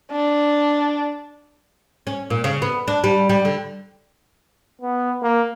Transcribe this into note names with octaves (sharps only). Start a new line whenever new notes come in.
D4
C#4
A#2
C#3
B3
D4
G3
G3
D3
B3
A#3